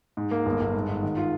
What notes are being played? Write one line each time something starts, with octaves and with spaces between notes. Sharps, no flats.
G#2
A#3
G1
G1
G#2
G#2
D#3
F4